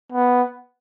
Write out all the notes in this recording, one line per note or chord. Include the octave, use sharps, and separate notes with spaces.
B3